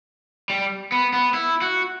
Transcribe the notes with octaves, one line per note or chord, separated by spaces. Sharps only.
G3
B3
B3
E4
F#4